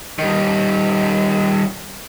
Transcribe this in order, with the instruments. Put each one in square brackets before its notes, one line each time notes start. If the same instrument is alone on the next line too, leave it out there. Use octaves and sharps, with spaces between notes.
[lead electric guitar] D#3 G3